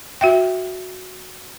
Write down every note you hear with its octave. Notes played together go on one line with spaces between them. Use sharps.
F#4 E5 G5